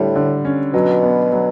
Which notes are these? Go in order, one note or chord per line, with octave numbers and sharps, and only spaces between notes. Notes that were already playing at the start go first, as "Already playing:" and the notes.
Already playing: A2 D3 G3
D3
C#4
B2 F#3
B3
F#3